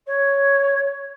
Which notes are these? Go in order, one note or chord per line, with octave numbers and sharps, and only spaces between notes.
C#5